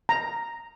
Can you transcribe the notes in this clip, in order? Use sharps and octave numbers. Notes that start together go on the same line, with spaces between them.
A#5